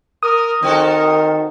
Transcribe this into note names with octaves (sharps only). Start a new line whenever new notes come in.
A#4 D#6
D#3 C4 F#4 A4 A#4